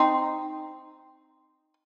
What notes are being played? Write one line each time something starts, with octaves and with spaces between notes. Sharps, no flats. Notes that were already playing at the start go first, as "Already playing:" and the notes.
Already playing: C4 D#4